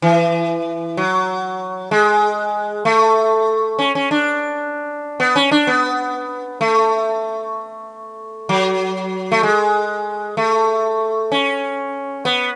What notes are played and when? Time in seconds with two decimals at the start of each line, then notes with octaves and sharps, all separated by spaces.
0.02 E3
0.97 F#3
1.91 G#3
2.85 A3
3.79 C#4
3.95 C#4
4.11 D4
5.20 B3
5.36 C#4
5.51 D4
5.67 B3
6.61 A3
8.49 F#3
9.32 A3
9.43 G#3
10.37 A3
11.32 C#4
12.25 B3